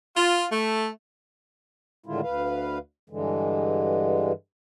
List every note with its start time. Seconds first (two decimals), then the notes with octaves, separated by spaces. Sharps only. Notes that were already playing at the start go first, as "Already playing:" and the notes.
0.16 F4
0.51 A3
2.06 A2 D3 D#3 G#3 E4 F4
2.23 D2 B4 F5
3.10 G2 D3 E3 G#3